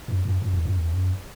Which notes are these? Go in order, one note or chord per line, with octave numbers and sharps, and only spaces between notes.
F#2
F#2
F#2
E2
F#2
E2
F#2